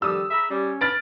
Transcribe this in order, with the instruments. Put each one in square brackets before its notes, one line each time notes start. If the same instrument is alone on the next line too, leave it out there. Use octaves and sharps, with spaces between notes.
[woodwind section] D3 D#3 F3 [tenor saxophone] G3 [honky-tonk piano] D#6 E6
[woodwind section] G#4 A#5 B5 [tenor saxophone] E5
[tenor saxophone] G3 [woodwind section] C#4
[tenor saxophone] B4 [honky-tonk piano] F6 A6 D7